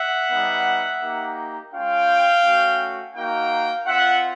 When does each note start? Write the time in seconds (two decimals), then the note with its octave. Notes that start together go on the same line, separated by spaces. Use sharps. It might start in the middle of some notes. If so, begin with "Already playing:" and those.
Already playing: E5 F#5
0.31 G3 B3 D#4
1.01 A#3 D#4 G4
1.73 G#3 C#4 F4 F5 G5
2.43 A3 C#4 F#4
3.15 A#3 D#4 F#4 F5 G5
3.86 C4 F4 E5 F#5